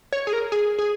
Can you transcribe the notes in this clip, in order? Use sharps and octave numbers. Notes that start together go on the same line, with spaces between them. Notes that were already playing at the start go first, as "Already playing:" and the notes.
C#5
G#4
A#4
G#4
G#4